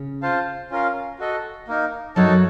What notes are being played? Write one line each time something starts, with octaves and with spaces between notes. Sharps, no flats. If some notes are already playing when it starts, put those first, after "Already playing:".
Already playing: C#3 C#4
F4 C5 F5 A5
C#4 F4 A#4 F5
F#4 A4 D#5
A#3 D#4 A#4
F#2 F#3 D#4 F#4 A4 C#5 A5